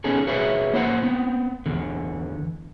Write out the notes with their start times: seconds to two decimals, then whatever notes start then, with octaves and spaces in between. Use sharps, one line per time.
0.04 B3 C#4 D#4 G#4 A4
0.27 F#4 G#4 B4 C#5 E5
0.73 A#3 E4 C5 F#5
1.03 B3 C4
1.66 E2 D3